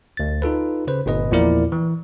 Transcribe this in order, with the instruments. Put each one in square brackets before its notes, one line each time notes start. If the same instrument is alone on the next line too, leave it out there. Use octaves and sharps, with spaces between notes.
[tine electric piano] D2 A6
D#4 F4 A4 B4
C#3 B4 C5
G1 A#2 B4 D#5
E2 A#2 F3 E4 A#4 D5
E3